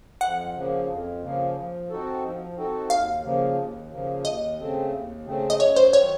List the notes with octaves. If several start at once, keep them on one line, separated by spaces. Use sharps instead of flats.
F2 F#5
C#3 F3 A#3
F2
C#3 F3 A#3
F3
C4 D#4 F#4 A4
F3
C4 D#4 F#4 A4
D#2 F5
C#3 F3 A#3
D#2
C#3 F3 A#3
D#2 D#5
C#3 A3 C4
D#2
C#3 A3 C4
D#5
F#2 C#5
C5
D#3 F#3 C#5